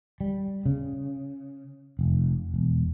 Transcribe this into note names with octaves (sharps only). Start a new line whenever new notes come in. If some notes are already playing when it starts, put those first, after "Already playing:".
G3
C#3
F1
E1